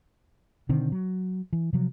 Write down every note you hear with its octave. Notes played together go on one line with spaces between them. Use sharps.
B2 D3 D#3 C4
F#3
E3
C3 F3 F#3